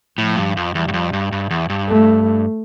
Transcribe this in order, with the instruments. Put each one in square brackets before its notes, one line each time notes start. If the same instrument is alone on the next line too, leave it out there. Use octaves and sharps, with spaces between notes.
[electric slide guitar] A2 [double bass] F3
[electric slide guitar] G2
F2
[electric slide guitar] E2 [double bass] G3
[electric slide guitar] G2
F2
G2
G2
E2
G2
[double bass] A3